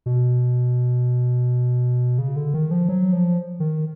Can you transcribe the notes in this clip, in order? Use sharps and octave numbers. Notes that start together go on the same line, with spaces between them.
B2
C#3
D3
D#3
F3
F#3
F3
D#3